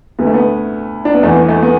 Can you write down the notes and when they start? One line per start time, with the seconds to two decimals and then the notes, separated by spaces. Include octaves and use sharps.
0.19 D2 D3 B3
0.27 A3
0.34 B3
1.05 D4
1.14 B3
1.23 E2 E3 A3
1.36 B3
1.48 A3
1.63 B3